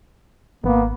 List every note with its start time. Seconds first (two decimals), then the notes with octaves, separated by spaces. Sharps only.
0.64 G#1 A#3 B3